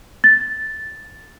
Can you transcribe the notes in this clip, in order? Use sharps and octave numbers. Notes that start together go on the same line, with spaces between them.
A6